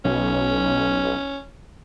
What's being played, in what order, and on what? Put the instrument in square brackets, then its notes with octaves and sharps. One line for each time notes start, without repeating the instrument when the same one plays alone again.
[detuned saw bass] B1 [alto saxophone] C#4